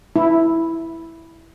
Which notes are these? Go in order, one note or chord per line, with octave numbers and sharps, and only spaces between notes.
E4